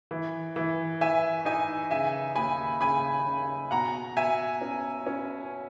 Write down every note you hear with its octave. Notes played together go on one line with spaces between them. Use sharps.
E3
E3
E3 E5 G#5
D#4 E5 G#5
C#3 E5 G#5
D#2 G#5 B5
C#3 G#5 B5
C#3
B2 F#5 A#5
B2 E5 G#5
C#4
C#4